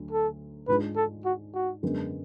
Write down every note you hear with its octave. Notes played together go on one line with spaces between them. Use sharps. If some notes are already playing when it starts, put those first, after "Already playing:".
Already playing: D2 D3 F#3
A4
G#2 G#3 D4 F4 B4
A4
F#4
F#4
F#2 D3 G#3 B3